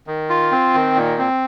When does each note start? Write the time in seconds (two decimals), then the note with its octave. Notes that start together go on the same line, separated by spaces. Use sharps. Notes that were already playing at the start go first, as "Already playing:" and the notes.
0.07 D#3
0.30 F4
0.52 C4
0.74 D#3
0.96 A#2
1.18 C4